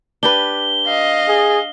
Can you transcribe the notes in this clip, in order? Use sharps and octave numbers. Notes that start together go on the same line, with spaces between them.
D4 G4 B4 G7
D#5 F5
G#4